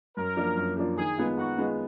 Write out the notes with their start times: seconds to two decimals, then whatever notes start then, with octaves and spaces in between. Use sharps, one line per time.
0.17 F#2 A#4
0.36 F3 A#3 D4 F4
0.57 F#2
0.77 F3 A#3 D4 F4
0.97 D#3 G#4
1.18 G#3 B3 F4
1.37 D#3 F#4
1.58 G#3 B3 F4